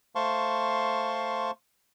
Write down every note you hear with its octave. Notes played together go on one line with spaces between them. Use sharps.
A3 C5 F5 A5 C6 C#6